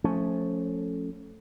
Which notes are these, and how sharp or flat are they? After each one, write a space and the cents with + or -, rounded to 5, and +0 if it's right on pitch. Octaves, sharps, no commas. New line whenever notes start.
F3 +15 A3 +0 C#4 +0